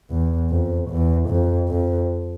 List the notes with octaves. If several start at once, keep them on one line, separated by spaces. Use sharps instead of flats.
E2
F2
E2
F2
F2